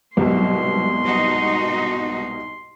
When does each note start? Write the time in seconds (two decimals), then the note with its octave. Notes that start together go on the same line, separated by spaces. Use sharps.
0.17 C2 G#2 B2 F#3 C6
1.06 D#4 F#4